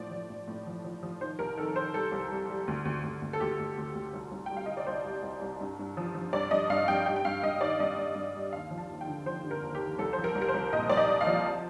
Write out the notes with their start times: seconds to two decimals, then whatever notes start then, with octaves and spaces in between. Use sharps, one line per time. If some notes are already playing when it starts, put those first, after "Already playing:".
Already playing: A2 F3 D5
0.11 F3
0.29 A2
0.48 A2
0.66 F3
0.84 F3
1.03 F3
1.20 D#3 C5
1.39 C2 A#4
1.57 D#3 A4
1.76 D#3 C5
1.94 G3 A4
2.12 C2
2.31 G3
2.50 G3
2.68 D2
2.85 D2
3.03 D2
3.22 D2
3.33 A4
3.40 D2 G4
3.59 D2
3.77 D2
3.95 D2
4.13 C2
4.31 C2
4.46 G3 G5
4.57 F5
4.66 G3 D#5
4.77 D5
4.87 C2 C5
5.05 G3
5.23 C2
5.41 C2
5.61 G2
5.79 G2
5.97 F3
6.15 F3
6.33 G2 D5
6.51 G2 D#5
6.70 G2 F5
6.88 G2 G5
7.06 G3 G5
7.16 G5
7.25 G2 F5
7.43 G2 D#5
7.61 D#3 D5
7.80 G2 D#5
7.98 G2
8.16 G2
8.34 G3
8.53 D#2 F5
8.71 F3
8.78 A5
8.90 D#2
9.01 G5
9.07 D3
9.26 F3 C5
9.45 D3
9.51 A#4
9.62 D#2
9.75 G4
9.80 D#2
9.98 C2 A4
10.13 F3 C5
10.24 A#4
10.35 C2
10.42 A#4
10.48 C5
10.54 C2
10.73 A#2 D#5
10.90 C2 D5
10.97 D#5
11.08 C2
11.21 F5
11.27 F3
11.46 A5